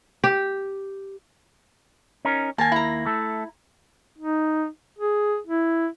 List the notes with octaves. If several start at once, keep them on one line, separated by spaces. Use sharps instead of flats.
G4
C#4 D#4 A#4
D#2 A#3 G#5 A5
E4 A#5
A3 A4
D#4
G#4
E4